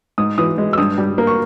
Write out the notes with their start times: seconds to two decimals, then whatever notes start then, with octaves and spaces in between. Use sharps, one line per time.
0.18 G#2 D#6
0.38 E3 D#6
0.58 G#3
0.73 E6
0.78 G2 D#6
0.98 G3
1.18 A#3
1.27 C#6